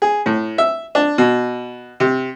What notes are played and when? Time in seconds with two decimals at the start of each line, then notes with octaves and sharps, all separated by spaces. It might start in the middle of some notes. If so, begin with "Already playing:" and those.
0.02 G#4
0.26 A2
0.58 E5
0.95 D4
1.18 B2
2.00 C3